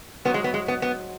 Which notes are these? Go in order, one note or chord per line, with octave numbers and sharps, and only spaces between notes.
G#2 F#3 B3
G#3
B3
G#3
B3
B3